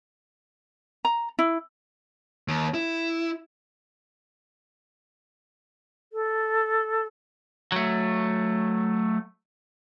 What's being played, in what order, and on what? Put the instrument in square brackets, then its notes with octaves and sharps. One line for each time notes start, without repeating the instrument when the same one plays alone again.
[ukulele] A#5
E4
[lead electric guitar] D#2
E4
[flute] A4
[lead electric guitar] F#3 A3